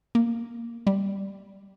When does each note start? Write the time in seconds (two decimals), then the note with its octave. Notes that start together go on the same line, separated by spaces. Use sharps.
0.15 A#3
0.87 G3